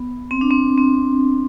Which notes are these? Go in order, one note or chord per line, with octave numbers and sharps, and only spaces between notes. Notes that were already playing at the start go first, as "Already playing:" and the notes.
Already playing: B3
C4
D4
C4
C4